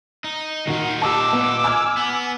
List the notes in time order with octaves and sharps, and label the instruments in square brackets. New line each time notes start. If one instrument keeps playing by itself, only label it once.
[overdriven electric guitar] D#4
[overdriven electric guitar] A#2 D#4 [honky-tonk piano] D#3 F#4
[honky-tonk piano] G4 A5 [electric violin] D6 E6
[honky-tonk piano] B3
G#5 F6 G#6
[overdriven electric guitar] B3